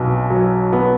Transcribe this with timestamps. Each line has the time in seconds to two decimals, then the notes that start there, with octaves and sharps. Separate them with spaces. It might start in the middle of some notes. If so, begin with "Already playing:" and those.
Already playing: B1 B2
0.30 F#3
0.72 B3